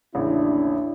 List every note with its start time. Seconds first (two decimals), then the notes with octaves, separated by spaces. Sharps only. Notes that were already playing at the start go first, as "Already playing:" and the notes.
0.15 A1 D#2 C#3 D4 E4